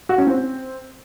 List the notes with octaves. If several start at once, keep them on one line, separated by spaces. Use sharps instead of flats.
F#4
C#4
C4